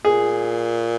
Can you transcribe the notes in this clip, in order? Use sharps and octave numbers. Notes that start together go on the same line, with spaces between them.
A#2 G#4